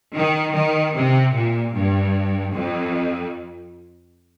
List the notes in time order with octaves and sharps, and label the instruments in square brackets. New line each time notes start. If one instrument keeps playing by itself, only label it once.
[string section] D#3
D#3
C3
A#2
G2
F2